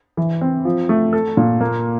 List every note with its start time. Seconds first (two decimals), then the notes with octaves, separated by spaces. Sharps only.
0.17 E3
0.41 C4
0.65 F3
0.89 A3
1.13 A4
1.37 A#2
1.61 A#3